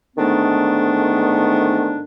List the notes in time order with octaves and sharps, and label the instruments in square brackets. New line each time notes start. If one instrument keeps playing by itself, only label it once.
[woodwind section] G#2 D3 D#3 A3 B3 D4